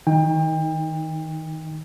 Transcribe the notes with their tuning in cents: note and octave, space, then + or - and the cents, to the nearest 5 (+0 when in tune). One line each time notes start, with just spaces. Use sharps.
D#3 +30 D#4 +0 G5 +35